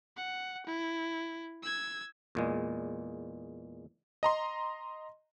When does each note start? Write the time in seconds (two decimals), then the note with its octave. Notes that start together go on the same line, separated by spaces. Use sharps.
0.16 F#5
0.66 E4
1.63 E6 G#6
2.35 E2 A#2 G#3
4.23 D#5 A#5 C6